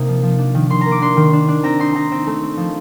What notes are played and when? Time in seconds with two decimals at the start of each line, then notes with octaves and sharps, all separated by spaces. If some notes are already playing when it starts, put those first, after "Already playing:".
Already playing: C3 A#3 D#4
0.08 F3
0.23 F3
0.39 D4
0.55 D#3
0.70 D#3 C6
0.81 A#3 A#5
0.91 D6
1.02 D4 C6
1.17 D#3
1.33 D4
1.48 D4
1.64 C4 A#5
1.80 D#4 C6
1.95 D#4 A#5
2.12 C4
2.27 A3
2.43 C4
2.57 F3